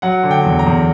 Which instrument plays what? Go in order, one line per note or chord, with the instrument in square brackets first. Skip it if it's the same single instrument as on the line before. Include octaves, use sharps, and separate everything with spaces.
[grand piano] F#3 F#5
D3
G5
E2
A#5
E2